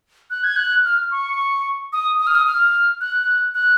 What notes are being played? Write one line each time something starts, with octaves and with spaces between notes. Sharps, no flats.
F#6
G#6
F#6
F6
C#6
D#6
D#6
F6
D#6
F6
F#6
F#6